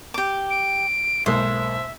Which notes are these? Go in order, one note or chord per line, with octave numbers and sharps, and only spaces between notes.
G4 D6
D7
B1 G#2 A#3 C5 E5